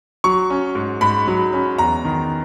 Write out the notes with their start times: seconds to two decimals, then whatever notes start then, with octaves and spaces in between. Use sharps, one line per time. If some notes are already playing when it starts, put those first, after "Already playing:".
0.24 F#3 C#6
0.50 C#4
0.75 G#2
1.01 G#2 B5
1.27 F#3
1.53 C#4
1.78 E2 A#5
2.05 D#3